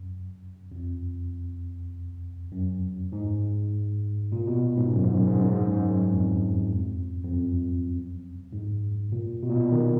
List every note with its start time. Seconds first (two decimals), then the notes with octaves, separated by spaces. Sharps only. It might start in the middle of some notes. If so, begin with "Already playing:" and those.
Already playing: F#2
0.72 F2
2.52 F#2
3.12 G#2
4.32 A#2
4.47 B2
4.77 G#2
4.93 F#2
5.04 G#2
5.15 F#2
5.27 G#2
5.38 F#2
5.50 G#2
5.61 F#2
5.72 G#2
5.85 F#2
6.13 F2
7.24 F2
7.33 F#2
8.53 G#2
9.12 A#2
9.43 B2
9.49 A#2
9.56 B2
9.72 D#3